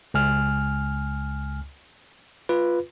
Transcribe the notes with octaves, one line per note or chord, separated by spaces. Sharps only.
C#2 G#5 F6
F4 B4